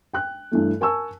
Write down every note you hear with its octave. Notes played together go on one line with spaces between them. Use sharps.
G5 F#6
G2 E3 A3
A#4 G#5 A5 C#6 E6